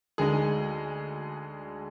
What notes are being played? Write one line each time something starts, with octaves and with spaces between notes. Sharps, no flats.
D2 D3 G#3 D#4 G#4